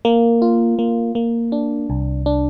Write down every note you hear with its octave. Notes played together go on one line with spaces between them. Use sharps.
A#3
F4
A#3
A#3
D4
C2
D4